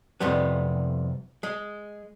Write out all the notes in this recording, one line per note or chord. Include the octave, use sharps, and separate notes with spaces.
C2 F2 C3 G3 B3
G#3